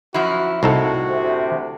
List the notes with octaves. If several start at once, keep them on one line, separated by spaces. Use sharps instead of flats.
F#2 F3 E4 F#4
C2 A2 D#4 F#4 A4
D2 C3